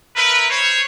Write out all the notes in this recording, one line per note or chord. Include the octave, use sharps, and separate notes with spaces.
E4 A#4 B4
C5 C#5